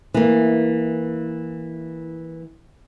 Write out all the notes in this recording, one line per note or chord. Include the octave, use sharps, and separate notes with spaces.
E3 A#3